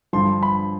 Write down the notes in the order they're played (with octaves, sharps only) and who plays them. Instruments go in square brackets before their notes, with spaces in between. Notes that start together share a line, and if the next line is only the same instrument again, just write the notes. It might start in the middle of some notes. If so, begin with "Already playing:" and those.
[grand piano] G2 D3 F3 C6
B5